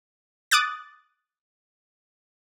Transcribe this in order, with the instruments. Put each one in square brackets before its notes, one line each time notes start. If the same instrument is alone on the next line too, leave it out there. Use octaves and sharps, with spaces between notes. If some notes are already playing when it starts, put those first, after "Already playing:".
[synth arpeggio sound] D6 D#6 F#6 A6